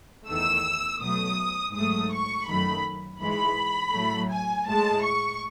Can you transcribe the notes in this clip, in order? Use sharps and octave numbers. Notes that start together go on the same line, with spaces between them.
E2 D#3 A3 E6
B2 F#3 A3 D#6
G#2 F#3 A3 D#6
C#6
F#2 D#3 F#3 A3 B5
G#2 E3 G#3 B5
A2 F#3 A3
G#5
A2 G#3 A5
C#6